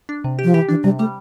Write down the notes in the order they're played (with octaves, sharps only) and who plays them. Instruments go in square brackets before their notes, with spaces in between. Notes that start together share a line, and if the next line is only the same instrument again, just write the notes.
[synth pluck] D4
C3
G4
[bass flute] F3
[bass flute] E3 [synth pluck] G4
[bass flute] E3 [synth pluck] D4
[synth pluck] C3 [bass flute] G3
[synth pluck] G3 [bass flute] A3